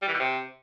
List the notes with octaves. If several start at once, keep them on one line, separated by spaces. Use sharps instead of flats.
G3
E3
B2
C3